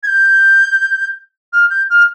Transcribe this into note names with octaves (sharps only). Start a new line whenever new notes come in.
G#6
G6
F6
G6
F6